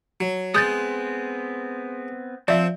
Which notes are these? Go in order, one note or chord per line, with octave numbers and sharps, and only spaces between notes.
F#3
G#3 B3 C4 D#6 G6 A6
F3 C4 D5 E5